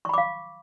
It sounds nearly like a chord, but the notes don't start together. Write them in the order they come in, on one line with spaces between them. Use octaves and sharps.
C#6 B5 D6 F5